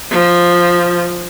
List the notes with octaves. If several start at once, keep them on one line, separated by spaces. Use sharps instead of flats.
F3